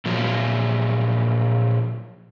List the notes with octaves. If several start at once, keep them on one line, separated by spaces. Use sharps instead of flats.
A#2 F3 F#3